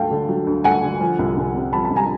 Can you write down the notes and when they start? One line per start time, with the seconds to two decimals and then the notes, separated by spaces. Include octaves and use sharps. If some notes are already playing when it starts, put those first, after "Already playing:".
Already playing: D2 F#3 A3 F5 G5 A5
0.11 D3
0.29 F#3
0.47 D2
0.64 A3 F#5 G#5
0.83 D3
1.01 F3
1.19 C2
1.37 C2
1.55 C3
1.73 F3 A5 B5
1.84 A5 B5
1.91 C2
1.96 G#5 A#5